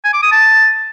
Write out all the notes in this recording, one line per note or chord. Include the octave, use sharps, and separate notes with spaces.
G#5
D6
D#6
A5